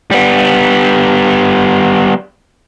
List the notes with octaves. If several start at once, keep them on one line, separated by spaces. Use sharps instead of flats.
G3 B3